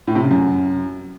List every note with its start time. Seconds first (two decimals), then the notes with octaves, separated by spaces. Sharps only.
0.07 A2
0.15 C3
0.23 C#3
0.31 F#2